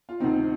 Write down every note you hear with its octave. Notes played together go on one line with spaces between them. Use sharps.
F4
D2 C3 D#3 C4 D#4